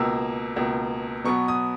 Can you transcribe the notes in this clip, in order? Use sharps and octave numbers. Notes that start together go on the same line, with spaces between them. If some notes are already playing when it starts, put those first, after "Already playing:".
Already playing: C#2 B2 A#3 E6
C#2 B2 A#3
B2 F#3 B3 C#6
D#6